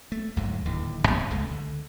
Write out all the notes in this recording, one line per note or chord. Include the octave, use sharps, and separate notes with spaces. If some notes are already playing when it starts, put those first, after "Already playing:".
A3
D2 G#2 D3 F#3
D1 D#2 D3 E3
E2 G2 G#3
C#2 C#3 G#3 A3
D3